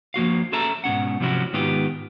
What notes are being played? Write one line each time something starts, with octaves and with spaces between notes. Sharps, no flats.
F3 A#3 F#4 F5
C#4 G#4 A4 E5 A5 A#5
G#2 B2 C#4 F#5
C3 F3 F#3 C#4 E4 F#4
G#2 D#3 B3 F4 G4